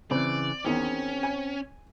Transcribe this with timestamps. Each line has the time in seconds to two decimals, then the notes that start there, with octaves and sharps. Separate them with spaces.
0.11 C#3 E3 C4 D5
0.65 E2 D#3 C4 C#4
1.23 G#5